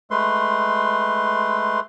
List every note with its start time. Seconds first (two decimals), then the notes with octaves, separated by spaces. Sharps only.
0.11 G#3 A3 B4 C6